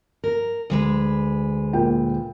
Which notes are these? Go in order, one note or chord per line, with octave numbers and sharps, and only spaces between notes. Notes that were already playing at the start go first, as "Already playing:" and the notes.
A#4
D2 G#3 B4
A#2 G5